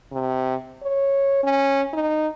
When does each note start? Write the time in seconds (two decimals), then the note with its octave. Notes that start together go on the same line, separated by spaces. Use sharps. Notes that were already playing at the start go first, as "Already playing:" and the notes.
0.12 C3
0.82 C#5
1.43 C#4
1.93 D#4